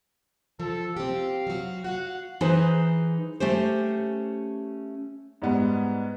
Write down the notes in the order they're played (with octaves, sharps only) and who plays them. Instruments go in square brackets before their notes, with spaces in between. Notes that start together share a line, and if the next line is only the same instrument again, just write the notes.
[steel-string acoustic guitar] F3 [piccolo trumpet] A4
[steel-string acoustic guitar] C4 G4 [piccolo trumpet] F5
[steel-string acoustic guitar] F#3 F#4
[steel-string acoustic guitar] F#4 F5 [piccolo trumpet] F#5
[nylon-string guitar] E3 D#4 G#4 B4 C5
A3 C#4 G4 C5
[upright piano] G#2 G3 B3